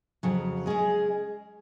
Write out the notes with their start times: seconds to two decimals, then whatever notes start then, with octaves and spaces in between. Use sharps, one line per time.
0.23 F2 C#3 F#3
0.66 G#3 C#4 G#4 D#5